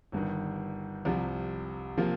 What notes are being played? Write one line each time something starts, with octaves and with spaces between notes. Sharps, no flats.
G1 G2 D#3
C2 C3 F3
C3 F3 A#3 F4